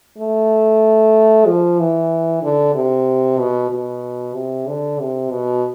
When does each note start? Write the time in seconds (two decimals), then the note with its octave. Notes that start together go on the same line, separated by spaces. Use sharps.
0.18 A3
1.46 F3
1.79 E3
2.43 D3
2.75 C3
3.40 B2
3.71 B2
4.35 C3
4.68 D3
5.00 C3
5.32 B2